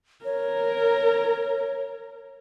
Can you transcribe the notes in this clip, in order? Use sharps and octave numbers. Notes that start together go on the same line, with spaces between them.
A#4 C#5